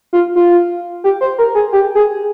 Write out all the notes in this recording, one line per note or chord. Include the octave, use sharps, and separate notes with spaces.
F4
F4
G4
C5
A#4
G#4
G4
G#4